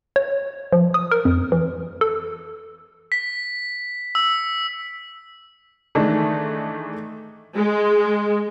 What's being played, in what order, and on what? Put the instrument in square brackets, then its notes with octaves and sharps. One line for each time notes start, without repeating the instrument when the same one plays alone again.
[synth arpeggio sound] C#5
F3
D#6
A#4
F2
E3
A4
[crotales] B6
E6
[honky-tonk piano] D#3 E3 G#3 A3 D4 D#4
[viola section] G#3